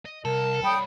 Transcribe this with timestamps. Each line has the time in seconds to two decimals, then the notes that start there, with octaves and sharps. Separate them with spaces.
0.06 D#5
0.25 C2 A4 A#4
0.64 G3 C#5 G5 B5 D#6